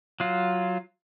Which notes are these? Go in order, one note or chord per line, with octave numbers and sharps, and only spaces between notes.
F#3 F4